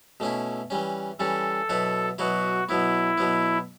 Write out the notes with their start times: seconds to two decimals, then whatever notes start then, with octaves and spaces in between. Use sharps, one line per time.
0.20 B2 A3 C#4 E4
0.70 E3 G3 C#4
1.19 E3 G3 C#4 A4
1.69 B2 F#3 B3 E4
2.18 B2 F#3 B3 E4 F#4
2.69 B2 F#3 B3 E4
3.18 B2 F#3 B3